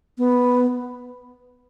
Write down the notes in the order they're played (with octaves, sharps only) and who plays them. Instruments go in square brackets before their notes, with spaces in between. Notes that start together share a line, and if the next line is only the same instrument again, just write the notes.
[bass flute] B3